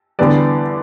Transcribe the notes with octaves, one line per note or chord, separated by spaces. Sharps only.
E2 D3 G3 B3 D5